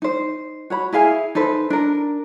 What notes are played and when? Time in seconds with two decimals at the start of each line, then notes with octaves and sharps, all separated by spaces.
0.02 D#4 C5
0.70 F#4 C#5 B5
0.92 E4 G#4 F5 G#5
1.35 D#4 A4 B4 C5
1.70 D4 A#4